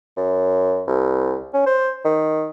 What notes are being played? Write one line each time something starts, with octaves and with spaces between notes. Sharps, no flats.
F#2
C2
C#4
C5
D#3